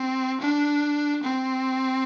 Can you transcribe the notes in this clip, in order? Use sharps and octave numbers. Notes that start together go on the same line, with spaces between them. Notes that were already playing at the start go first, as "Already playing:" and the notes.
Already playing: C4
D4
C4